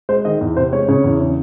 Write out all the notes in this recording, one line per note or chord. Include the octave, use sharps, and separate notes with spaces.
G#3 C5
D#3 D#5
E2
C3 C5
G#3 C#5
C#3 C#5
E2
C#3